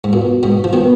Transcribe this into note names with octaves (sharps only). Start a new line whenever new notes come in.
G#2
A#2 B3 F#4 B4
G#2 B2
F3
B2 D#3 B3 F#4 B4